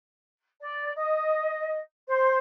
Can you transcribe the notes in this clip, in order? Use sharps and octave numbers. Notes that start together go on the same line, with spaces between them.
D5
D#5
C5